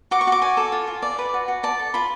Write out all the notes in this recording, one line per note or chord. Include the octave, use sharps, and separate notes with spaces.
F#4 D6
C#6
F#4
D6
D5 G#5
A4
F4
F4
D5
B4
F#4
F#4
D5 A5
A4
F4 B5